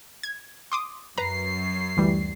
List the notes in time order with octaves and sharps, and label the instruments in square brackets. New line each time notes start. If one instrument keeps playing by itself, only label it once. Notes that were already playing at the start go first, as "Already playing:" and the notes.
[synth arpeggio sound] G#6
C6 D6 D#6
[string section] F#2 C7 [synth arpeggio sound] B4 A#5
[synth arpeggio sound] D2 E3 G3